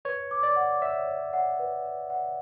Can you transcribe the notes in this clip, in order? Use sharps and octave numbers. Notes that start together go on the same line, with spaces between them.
B4 C#5
D6
D5
F#5
C#5 E5
C#5
F#5
B4
B4
F#5